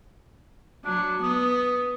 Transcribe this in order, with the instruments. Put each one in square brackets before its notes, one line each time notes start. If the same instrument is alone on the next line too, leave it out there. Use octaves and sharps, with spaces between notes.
[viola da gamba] F#3 [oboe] D4
[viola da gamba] B3 [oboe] D#6